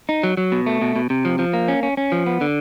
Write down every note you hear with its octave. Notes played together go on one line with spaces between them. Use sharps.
D#4
F#3
F#3
B2
A3
B2
B2
C3
F3
F3
A#3
C#4
C#4
C#4
F3
B3
D3